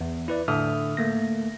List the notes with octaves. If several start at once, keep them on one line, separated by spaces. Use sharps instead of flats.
E2
E4 B4 D5
A2 D3 E5 D#6 F6
A3 A#3 A#6